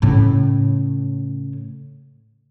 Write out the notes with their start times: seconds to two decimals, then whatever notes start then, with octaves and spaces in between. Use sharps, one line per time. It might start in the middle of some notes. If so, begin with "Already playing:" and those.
0.02 A2 C#3